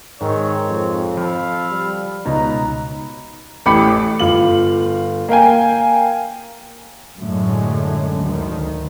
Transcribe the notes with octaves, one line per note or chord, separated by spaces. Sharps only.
G#2 D#3 C4 C#5
F2
F3 A4 F5 B5
G3
C#2 B2 D#4 B4 A#5
A1 A2 G4 B5 D6 C#7
D6
G1 F4 F#7
A#3 F5 G5 G#5
F#2 A2 D3 F#3 G#3 A3
D2 D#3